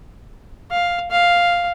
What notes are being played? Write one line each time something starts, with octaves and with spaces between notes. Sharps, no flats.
F5
F5